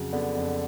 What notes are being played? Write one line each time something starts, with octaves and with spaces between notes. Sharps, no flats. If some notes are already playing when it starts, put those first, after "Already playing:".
Already playing: F2 C#3 F#3
D3 B3
F2